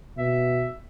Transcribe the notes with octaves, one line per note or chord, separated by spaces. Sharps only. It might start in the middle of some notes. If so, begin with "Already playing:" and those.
B2 E5